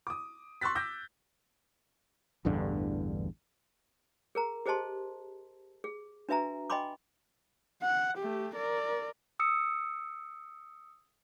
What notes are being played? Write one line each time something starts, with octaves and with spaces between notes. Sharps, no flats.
D6 D#6
C6 C#6 E6 F#6 A6 B6
D6 E6 G6 A#6
A1 E2 G2 D3
G#4 A#4 A#5
G4 G#4 C5 D#5 A5 C6
G#4
D4 F#4 B4 E5 G#5 A#5
D#5 G5 G#5 B5 C6 D6
F#5
A3 G4
A#4 D5
D#6 E6 C#7